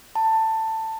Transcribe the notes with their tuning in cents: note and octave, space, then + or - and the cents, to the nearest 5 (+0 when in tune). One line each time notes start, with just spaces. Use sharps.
A5 +15